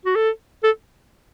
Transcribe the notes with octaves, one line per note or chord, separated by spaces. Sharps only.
F#4
A4
A4